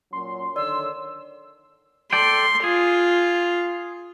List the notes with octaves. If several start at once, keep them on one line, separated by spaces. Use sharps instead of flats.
A#2 F#3 C#4 C6
D3 D#3 C#5 D5 E6
A4 D5 G5 C6
F4 G#4